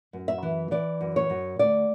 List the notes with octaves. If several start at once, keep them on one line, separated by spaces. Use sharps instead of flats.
F#2
E5
E3
E3 D5
F#2
C#5
F#2
D2 D5